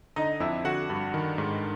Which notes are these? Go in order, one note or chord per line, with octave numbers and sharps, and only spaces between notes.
D3 D#4 D#5
F2 E4 E5
D3 F#4 F#5
G2
D#3
G#2